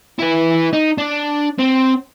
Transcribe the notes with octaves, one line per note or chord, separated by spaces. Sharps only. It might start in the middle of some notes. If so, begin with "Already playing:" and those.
E4 B4
D#4
D4
C4